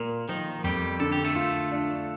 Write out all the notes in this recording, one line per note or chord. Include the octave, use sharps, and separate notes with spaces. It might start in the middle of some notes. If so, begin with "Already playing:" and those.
Already playing: A#2 A#3
D#3 F3 D#4
F2 G3 G4
D3 A4
G4
A3 A4
F4
D4